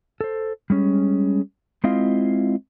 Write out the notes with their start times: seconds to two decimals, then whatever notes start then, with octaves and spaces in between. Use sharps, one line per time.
0.21 A4 C5
0.70 G3 G#3 C#4
1.84 G#3 C4 E4 F4 D#5 F5